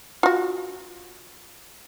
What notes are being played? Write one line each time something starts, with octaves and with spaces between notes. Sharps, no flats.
F4 F#4